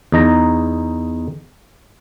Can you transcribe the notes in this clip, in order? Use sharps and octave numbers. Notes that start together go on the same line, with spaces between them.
E2 D#4 A#5